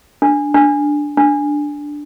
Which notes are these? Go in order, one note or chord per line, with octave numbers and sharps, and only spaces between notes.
D4
D4
D4